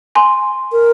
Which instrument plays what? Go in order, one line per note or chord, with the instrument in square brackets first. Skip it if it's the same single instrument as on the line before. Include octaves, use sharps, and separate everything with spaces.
[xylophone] G#5 C6
[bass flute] A#4